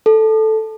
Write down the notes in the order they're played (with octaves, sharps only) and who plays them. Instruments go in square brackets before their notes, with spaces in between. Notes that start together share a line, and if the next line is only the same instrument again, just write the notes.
[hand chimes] A4